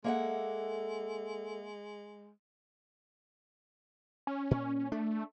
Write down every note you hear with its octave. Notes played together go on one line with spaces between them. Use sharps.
G#3 A#3 A4 E5 F#5
C#4
A#2
A3 D4